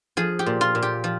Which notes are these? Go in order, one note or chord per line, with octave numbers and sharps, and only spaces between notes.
F3 G#4
G4
A#2
F4
A#2
G4
F3